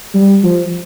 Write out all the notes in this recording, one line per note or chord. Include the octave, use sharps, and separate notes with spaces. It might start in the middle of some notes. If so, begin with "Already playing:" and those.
G3
F3